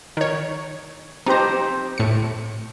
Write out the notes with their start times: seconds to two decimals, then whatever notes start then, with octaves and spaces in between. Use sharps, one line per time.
0.17 D#3 C#5
1.26 C4 D#4 G4 C5 A#5
1.98 A2 C#7